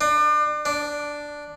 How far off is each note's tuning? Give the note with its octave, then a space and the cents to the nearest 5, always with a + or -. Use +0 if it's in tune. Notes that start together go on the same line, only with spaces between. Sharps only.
D4 +35
D4 +0